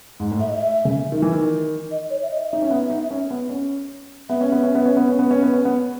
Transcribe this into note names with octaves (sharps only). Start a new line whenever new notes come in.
G#2
A2
E5
D#5
E5
C#3
D#3
E3
D#3
D#5
C#5
E5
D#5
D#4 E5
C#4
B3
D#4
C#4
B3
C#4
B3 E5
C#4
B3
C#4
B3
C#4
B3
C#4
B3
C#4
B3
C#4
B3